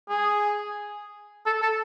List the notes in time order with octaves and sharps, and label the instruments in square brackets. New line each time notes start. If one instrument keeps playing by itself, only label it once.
[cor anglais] G#4
A4
A4